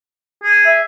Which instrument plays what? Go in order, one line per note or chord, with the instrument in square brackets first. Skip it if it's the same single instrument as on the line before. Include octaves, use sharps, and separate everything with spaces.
[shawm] G#4
[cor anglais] E5